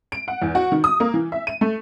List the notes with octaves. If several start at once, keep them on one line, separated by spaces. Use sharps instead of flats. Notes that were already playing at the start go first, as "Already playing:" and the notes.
D7
F#5
E2
F#4
D#3
D#6
A#3
E3
E5
D#7
A3